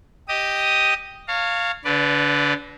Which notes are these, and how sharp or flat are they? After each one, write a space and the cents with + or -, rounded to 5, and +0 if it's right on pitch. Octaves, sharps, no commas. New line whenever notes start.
G4 +0 D#5 +0 D#6 +0
C#5 +0 F5 +0 A5 +45
D3 -30 B4 +0 D5 +0